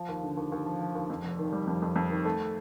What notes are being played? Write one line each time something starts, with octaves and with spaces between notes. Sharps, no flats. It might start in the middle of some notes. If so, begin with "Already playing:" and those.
Already playing: F3
D#2
D3
D#2
D#2
F3
F3
D#2
F2
F1
D#3
G3
F2
F2
F2
D#3
A3